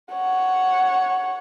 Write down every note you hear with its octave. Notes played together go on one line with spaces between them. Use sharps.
C#5 F#5